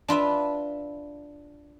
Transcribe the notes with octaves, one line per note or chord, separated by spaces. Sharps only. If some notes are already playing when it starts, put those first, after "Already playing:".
D4 F4 B4 E5